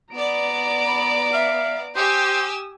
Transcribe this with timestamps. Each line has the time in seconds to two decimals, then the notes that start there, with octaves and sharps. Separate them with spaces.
0.15 B3 D5 A#5 D7
0.86 B5
1.33 E5 F5
1.96 G4 C5 G#5 D#6 E6